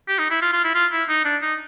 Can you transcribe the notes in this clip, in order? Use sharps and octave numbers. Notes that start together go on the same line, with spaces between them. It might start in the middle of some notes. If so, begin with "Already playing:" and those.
G4
D#4
E4
F4
F4
E4
F4
E4
D#4
D4
D#4